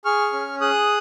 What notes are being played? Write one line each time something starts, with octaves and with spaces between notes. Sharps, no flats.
G#4 C#6 F6
C#4
G#4 D#6 F#6